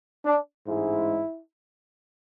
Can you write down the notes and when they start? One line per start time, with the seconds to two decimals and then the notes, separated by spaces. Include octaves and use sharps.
0.25 D4
0.67 A1 G#2 G#3 E4